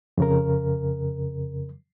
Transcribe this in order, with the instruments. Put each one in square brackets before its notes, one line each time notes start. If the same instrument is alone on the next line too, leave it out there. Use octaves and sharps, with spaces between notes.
[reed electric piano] F2 C#3 A#4